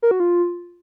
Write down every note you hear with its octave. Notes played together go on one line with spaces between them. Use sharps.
A#4
F#4
F4